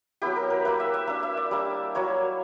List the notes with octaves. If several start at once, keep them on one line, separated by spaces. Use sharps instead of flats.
F#3 B3 E4 G4
A#4
A#4
A#3 E4 B4
E5
E5
A#3 D4 E5
E5
D5
G3 A#3 D4
F#3 A#3 E4 C#5